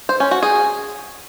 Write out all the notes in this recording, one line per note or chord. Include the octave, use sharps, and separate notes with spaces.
C5
C#4
F#4
G#4